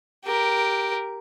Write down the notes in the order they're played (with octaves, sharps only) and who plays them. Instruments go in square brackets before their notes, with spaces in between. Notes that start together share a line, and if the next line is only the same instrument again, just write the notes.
[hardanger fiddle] G4 A#4